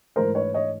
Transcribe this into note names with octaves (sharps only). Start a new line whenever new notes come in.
G#2 E3 A3 A#4 C5
B4 C#5
C#5 D#5